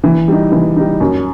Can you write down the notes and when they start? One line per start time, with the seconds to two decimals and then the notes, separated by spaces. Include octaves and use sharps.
0.04 E3
0.28 G3 D#4
0.52 E3
0.76 G3 D#4
1.00 F#2